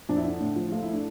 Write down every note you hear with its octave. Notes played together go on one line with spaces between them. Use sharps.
F2 D4
E4
D3 D4
A2
F3
A3 F4
E4
A3 D4